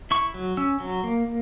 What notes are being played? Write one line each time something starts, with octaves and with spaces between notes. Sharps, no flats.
E4 C#6
F#3
C#4 E6
F#3
A#3